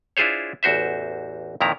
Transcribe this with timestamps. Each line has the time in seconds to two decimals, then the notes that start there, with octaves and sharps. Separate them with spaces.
0.17 D4 E4 F4 G#4 C5 C#5
0.63 A1 E2 F#4 C5 E5
1.61 F2 A#2 D#3 E4 A#5